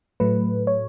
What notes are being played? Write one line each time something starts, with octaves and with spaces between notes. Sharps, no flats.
A2 F#3 A3 B4
C#5